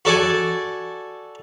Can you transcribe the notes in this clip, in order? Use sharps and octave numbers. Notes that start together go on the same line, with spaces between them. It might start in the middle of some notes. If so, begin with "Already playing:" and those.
F#4 A4 D5 G#5